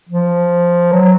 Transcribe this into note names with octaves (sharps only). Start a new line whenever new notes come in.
F3
F#3